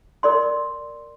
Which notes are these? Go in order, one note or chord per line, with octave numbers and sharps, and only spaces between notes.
A#4 D5 C6